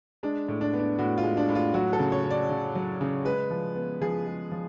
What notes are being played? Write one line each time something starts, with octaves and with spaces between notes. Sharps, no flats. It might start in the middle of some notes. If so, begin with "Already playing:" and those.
G#3 D4
A2
D4
B3
D4
A2 F#4
F4
G#3
D4
A2
F4
F#3 F#4
A4
C#3
C#5
C#4
D5
C#3
F#3
C#3
G#3 B4
F3
B3
F3 G#4
G#3
F3